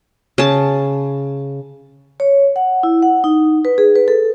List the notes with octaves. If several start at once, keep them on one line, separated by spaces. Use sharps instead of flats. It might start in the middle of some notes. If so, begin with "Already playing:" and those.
C#3 A5
C#5
F#5
E4
F#5
D#4
B4
G#4
B4
A4